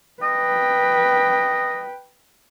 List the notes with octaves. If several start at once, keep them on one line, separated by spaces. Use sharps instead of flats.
B4 D#5 G5